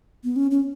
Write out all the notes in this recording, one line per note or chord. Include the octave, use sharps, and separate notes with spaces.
B3
C#4
C#4